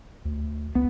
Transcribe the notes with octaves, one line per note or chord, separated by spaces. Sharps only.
D2
C#2 B3